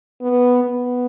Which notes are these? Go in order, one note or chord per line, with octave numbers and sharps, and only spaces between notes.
B3
B3